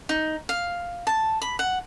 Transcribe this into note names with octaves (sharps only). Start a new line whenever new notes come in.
D#4
F5
A5
B5
F#5